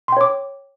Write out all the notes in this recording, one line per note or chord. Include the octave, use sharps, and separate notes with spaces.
C#5 G5 C6 D6